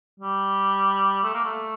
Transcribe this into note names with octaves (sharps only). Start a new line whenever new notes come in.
G3
A3
A#3
A3